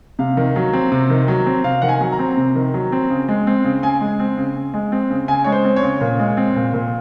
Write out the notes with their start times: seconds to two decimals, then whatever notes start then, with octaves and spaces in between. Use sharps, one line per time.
0.19 C3 F5
0.37 D#3
0.56 F#3
0.73 C4
0.92 C3
1.10 D#3
1.28 F#3
1.46 C4
1.64 C3 F5
1.82 D#3 F#5
1.89 G#5
2.01 F#3
2.12 A#5
2.19 C4
2.37 C3
2.55 D#3
2.74 F#3
2.92 C4
3.10 C#3
3.29 G#3
3.47 C4
3.65 C#3
3.83 C#3 G#5
4.01 G#3
4.20 C4
4.37 C#3
4.56 C#3
4.74 G#3
4.92 C4
5.10 C#3
5.28 C#3 G#5
5.44 G#3 C#5
5.52 C5
5.65 C4
5.76 C#5
5.83 C#3
6.01 A#2
6.19 G#3
6.37 C4
6.56 A#2
6.74 A#2